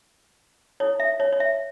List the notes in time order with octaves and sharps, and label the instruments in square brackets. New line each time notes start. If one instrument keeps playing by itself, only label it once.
[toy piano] E4 A4 C#5
E5
C#5
C#5
E5